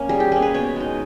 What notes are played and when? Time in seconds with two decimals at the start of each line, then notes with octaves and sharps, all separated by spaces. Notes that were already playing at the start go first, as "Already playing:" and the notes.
Already playing: A#3 C#4
0.09 G3 G#4
0.20 G4
0.32 A#3 C#4 G#4
0.42 B4
0.54 B2 C#5
0.76 G#3 D#4